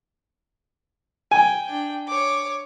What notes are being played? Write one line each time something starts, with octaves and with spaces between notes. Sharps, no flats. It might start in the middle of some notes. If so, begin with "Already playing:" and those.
G5 G#5
D4 G5
C#5 D6